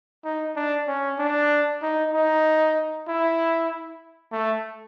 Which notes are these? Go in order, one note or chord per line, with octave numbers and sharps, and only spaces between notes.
D#4
D4
C#4
D4
D#4
D#4
E4
A3